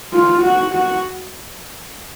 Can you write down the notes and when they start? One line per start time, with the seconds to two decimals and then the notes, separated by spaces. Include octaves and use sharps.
0.13 F4
0.43 F#4
0.74 F#4